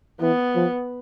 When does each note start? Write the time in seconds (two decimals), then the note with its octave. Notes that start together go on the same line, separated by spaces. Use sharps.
0.21 E3 B3
0.55 F3